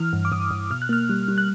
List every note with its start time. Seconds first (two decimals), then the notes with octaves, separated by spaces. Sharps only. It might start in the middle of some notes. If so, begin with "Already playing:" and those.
Already playing: E3 F6
0.13 G2
0.25 D6
0.32 G2 D#6
0.51 G2
0.71 B2 F6
0.82 F#6
0.89 A#3 F6
1.09 G3
1.28 G3
1.38 F#6